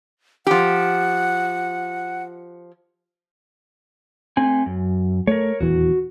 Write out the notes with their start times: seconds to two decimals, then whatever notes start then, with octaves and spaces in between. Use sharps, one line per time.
0.47 F3 G4 F#5
4.37 A3 C4 G#5
4.66 F#2
5.27 A3 A#4 C#5
5.61 D#1 E2 E3 F#4